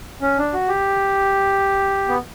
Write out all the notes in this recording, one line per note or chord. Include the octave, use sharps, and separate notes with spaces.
C#4
D4
F#4
G4
B3